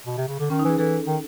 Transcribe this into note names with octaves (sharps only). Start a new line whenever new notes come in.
B2
C3
C#3
D3
D#3 C#4
D#4
E3
G#4
E3 A4
D#3